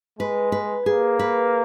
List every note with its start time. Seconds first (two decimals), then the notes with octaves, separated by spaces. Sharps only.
0.19 G#3 B4
0.52 B4
0.86 A#3 G#4
1.19 B4